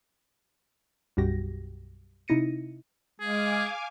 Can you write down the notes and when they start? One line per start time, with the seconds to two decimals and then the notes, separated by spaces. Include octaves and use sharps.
1.17 B1 F#2 G3 F#4 G4 A#6
2.28 C3 D#4 E4 A#6 C#7 D#7
3.20 G#3 G#4 F5 G#5 D6